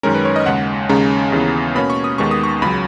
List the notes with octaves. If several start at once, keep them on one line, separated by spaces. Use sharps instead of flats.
F#2 D#3 G#3 C#4 A#4
B4
C#5
D#5
D#2 C#3 G#3 F#5
D#2 C#3 G#3 C#4 A#5
D#2 C#3 E3 B3
B2 A#3 C#4 B5
C#6
D#6
D#2 D#3 G#3 B3 C#6
D#6
C#6
C#2 C#3 F#3 B5